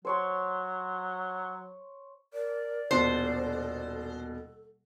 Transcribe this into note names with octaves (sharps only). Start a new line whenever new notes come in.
F#3 C5 C#5 C6
A#4 D5
D#1 B2 D4 A4 C5